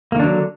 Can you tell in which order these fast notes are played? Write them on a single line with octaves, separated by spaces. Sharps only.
A#3 D#3 D4 F#3 D3